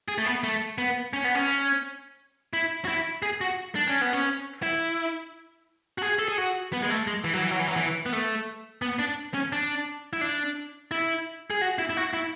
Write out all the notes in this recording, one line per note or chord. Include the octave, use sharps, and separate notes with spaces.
G#4
A3
B3
A3
B3
C#4
B3
C#4
E4
F#4
E4
G#4
F#4
D4
C#4
B3
C#4
E4
F#4
G#4
A4
G#4
F#4
B3
G#3
A3
G#3
E3
F#3
E3
F#3
E3
F#3
E3
B3
A3
B3
D4
C#4
D4
E4
D4
E4
G#4
F#4
E4
E4
F#4
E4